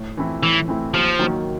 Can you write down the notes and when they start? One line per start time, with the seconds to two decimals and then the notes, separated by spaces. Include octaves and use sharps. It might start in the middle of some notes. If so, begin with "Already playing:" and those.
Already playing: A2
0.17 E3 A3 C4 E4
0.43 A2 E3
0.68 E3 A3 C4 E4
0.94 D#2 F3
1.19 D#3 F#3 A#3